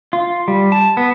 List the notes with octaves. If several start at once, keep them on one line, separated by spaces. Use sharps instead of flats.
F4
G3
A5
B3